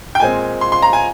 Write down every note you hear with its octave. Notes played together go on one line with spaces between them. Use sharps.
G5
A#2 G#3 C4 G#5
C6
C6
A#5
G#5